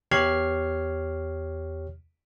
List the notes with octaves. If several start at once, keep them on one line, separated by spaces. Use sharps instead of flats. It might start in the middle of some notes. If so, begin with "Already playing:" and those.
E2 G4 C#5 F6 G#6 C7